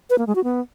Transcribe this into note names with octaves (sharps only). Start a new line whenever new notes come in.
B4
A#3
G#3
F#4
B3